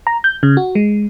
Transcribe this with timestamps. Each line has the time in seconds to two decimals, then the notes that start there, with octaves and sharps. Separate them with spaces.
0.07 A#5
0.24 G6
0.43 C#3
0.57 F#4
0.75 G#3